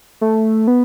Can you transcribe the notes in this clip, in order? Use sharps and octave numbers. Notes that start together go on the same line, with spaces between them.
A3
B3